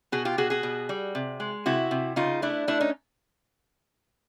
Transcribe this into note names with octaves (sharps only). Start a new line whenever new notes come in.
B2 F#4 G#4
F4 G4
B2 F#4 G#4
F#4 G#4
B2
G3
C3
G#3
C3 E4 F#4
C3
C#3 D#4 F4
A3 D4 E4
A3 D4 E4
C#4 D#4